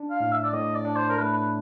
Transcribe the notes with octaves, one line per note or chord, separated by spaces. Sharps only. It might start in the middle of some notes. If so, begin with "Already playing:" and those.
Already playing: D4
F5
A2
E5
D5
A2 D#5
D5
D4
C5
A#4
A3 B4
B4